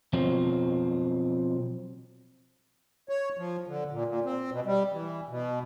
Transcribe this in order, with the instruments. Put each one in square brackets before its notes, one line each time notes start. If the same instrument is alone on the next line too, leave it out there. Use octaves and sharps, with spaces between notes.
[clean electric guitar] B2 F3 F#3 C4
[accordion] C#5
F3
D3
A#2
A#2
C4
B2
G3
E3
B2